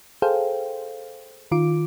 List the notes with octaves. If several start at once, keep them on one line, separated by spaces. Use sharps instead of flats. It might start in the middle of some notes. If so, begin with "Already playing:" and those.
G#4 A4 C5 F5 G5
D#3 F4 D6 D7